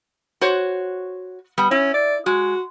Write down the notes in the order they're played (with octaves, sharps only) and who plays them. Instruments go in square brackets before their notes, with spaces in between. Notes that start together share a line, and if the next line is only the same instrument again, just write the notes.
[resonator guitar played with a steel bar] F#4 C5 C#5
G3 B3
[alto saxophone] C#4 [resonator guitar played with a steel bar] E4
[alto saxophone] D5
[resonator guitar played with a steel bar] G#3 [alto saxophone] F#4